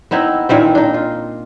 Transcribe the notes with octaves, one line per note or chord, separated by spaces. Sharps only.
B3 C4 D#4 E4
A#2 D#3 E3 C4
D4 D#4
F4